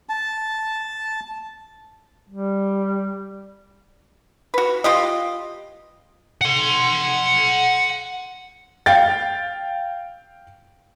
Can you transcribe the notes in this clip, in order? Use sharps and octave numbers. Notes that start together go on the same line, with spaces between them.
A5
G3
F#4 B4
F4 G4 D#5
F#5 C6
F5 G5 A6